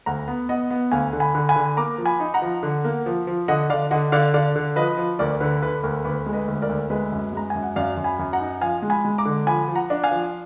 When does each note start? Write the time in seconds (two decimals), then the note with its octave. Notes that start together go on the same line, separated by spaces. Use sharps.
0.06 D2 F#5 A#5
0.28 B3
0.49 B3 D#5 F#5
0.71 B3
0.92 D2 F5 G#5
1.13 D3
1.20 G#5 B5
1.35 D3
1.49 G#5 B5
1.56 D3
1.77 A#3 A#5 D6
1.98 F3
2.06 G#5 B5
2.20 D#4
2.34 F#5 A#5
2.42 F3
2.63 D3
2.85 A#3
3.06 F3
3.27 F3
3.48 D3 D#5 F#5
3.70 D3 D5 F5
3.91 D3 D#5 F#5
4.12 D3 D5 F5
4.34 D3 D5 F5
4.56 D3
4.76 F3 B4 D#5
4.98 F3
5.19 D2 A#4 D5
5.40 D3 B4
5.62 D3 B4
5.83 D2 A#4
6.04 D2 B4
6.26 G#3
6.33 B4 D#5
6.48 D2
6.62 A#4 D5
6.69 D2
6.90 G#3 B4 D#5
7.12 F#2
7.33 G#3 A#5
7.50 F#2 G#5
7.63 F#5
7.76 F#2 D5 F5
7.97 F#2
8.04 G#5 B5
8.19 F#2
8.33 F#5 A#5
8.40 D#4
8.61 F3 F5 G#5
8.82 G#3
8.90 G#5 B5
9.05 G#3
9.18 A#5 D6
9.25 D3
9.47 F3 G#5 B5
9.68 F3
9.75 F#5 A#5
9.90 D4
10.04 F5 G#5
10.11 F3